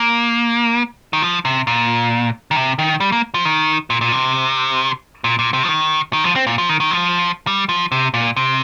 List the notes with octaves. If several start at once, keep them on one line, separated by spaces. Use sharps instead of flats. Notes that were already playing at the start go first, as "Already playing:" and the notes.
Already playing: A#3
D#3
F3
C3
A#2
D#3
C3
D#3
G3
A#3
F3
D#3
A#2
A#2
C3
A#2
A#2
C3
F3
D#3
D#3
F3
C4
A#2
F3
D#3
D#3
F3
G3
F3
C3
A#2
C3